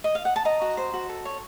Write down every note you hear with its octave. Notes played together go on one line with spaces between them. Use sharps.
D#5
F5
F#5
A5
D#5 A#5
F#4
C5
F#4
A4
C#5